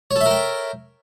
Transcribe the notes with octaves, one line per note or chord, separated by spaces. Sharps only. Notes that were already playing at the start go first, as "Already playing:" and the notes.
A4 A#4 C#5 E5 G5